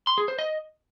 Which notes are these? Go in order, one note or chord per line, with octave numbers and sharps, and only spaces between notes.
C6
G#4
C5
D#5